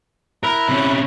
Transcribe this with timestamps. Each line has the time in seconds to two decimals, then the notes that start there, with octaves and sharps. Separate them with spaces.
0.43 E4 A#4 E5 F#6
0.69 C3 C#4